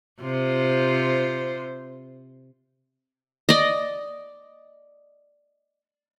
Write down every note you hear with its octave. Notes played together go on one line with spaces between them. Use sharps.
C3 F4 C5
D5 D#5